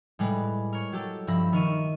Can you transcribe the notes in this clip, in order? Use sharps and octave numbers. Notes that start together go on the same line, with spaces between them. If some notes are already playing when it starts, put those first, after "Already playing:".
A2 G3 G#3 B4
A#4 C#5
F#3 G4 A4
G2 F3 E5 B5 A#6
D#3 A#4 C#6 D#7 E7